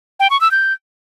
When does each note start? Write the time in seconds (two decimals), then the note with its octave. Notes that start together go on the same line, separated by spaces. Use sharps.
0.20 G5
0.30 C#6
0.41 E6
0.51 G6